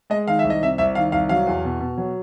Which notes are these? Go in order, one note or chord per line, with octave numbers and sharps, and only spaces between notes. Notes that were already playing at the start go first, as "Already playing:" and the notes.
G#3 D#5
D#3 F5
E5
C2
D#5
C3 E5
C2 E5
D#3 F5
C2 F5
F#3 F5
E2
B2
B2
F#3